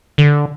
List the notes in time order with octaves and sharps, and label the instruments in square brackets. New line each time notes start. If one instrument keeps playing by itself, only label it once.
[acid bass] D3